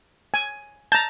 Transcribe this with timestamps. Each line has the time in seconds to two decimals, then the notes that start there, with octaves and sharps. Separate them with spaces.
0.34 G#5
0.92 A5 A#5 G6